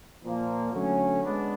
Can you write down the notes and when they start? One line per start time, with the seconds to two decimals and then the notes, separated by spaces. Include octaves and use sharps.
0.24 A#2 F3 A#3
0.73 D3 F#3 A3 C#4
1.22 G#3 B3 D4